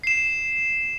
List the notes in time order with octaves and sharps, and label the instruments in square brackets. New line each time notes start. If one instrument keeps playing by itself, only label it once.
[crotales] C7 E7